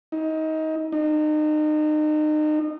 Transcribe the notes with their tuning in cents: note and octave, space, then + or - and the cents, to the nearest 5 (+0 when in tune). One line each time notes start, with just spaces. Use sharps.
D#4 +25
D#4 -30